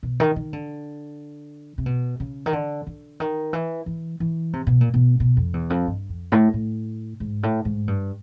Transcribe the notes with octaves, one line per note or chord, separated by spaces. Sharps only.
B2
D#3
D#3
D3
C3
B2
C#3
D#3
D3
D3
D#3
E3
E3
E3
C3
B2
A#2
B2
B2
F2
E2
F2
G2
F2
A2
A2
G#2
A2
G#2
G2